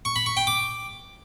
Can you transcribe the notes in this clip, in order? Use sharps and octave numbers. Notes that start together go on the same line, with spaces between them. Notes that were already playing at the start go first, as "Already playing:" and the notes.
C#6
B5
C#6
G5
D6